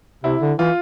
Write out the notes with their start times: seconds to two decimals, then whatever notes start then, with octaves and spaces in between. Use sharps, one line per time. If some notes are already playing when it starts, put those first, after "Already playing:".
0.24 C3 E4
0.41 D3
0.58 E3 F4